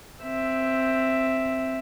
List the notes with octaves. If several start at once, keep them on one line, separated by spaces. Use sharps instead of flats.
C4 E5